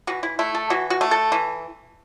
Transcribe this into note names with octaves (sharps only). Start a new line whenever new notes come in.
E3 F#4
E4
A3 E4
A4
E3 F#4
F#4
A3
A4
E3